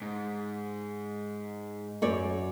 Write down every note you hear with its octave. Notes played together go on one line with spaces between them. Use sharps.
G#2
F#2 C#5 D5